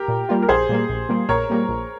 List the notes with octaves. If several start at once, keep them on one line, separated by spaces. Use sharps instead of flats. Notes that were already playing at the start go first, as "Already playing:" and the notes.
Already playing: G4 A#4
A#2
G3 A#3 F4
A#4
A#1 G#4 C5
A#2 G3 A#3
A#1
A#2 G3 A#3
A#1 A#4 C#5
A#2 G3 A#3
A#1